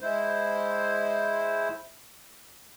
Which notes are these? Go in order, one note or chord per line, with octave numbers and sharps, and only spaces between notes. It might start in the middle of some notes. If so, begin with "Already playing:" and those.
G#3 E4 C5